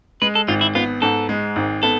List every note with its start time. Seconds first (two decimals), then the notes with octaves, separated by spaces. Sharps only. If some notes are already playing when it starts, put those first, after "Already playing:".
0.22 G#3 B4
0.35 A4
0.48 G#1 F4
0.61 E4
0.75 B3 F4
1.02 G#2 A4
1.29 G#3
1.56 G#1
1.83 B3 A4